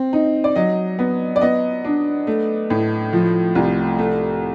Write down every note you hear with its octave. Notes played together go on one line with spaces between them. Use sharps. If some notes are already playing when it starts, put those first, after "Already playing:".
Already playing: C4
D#4
D5
F#3 D#5
B3
D5
B3 D#5
D4
A3
A2
F3
C2
A3